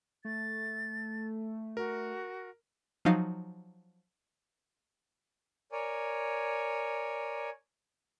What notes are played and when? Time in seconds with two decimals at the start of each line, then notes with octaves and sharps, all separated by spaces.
0.25 A3 A6
1.77 F#4 A#4
3.05 F3 F#3 D#4 F5
5.72 A#4 C#5 D5 G#5